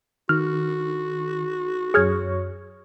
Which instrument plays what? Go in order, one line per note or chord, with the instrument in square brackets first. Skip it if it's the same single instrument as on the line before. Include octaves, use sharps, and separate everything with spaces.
[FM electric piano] D#3 [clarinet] F#4 [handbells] F6
[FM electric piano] F#2 C#5 C#6 [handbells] G#4 F6 G#6